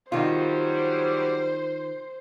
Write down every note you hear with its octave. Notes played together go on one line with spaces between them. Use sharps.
D#3 F#3 G3 F4 C5